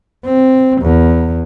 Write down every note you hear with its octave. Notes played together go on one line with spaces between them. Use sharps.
C4
E2